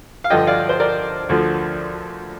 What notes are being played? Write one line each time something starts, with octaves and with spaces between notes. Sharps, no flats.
F5
G2 D3 F3 D#5 G5
D5 F5
C5
A#4 D5
D2 D3 F3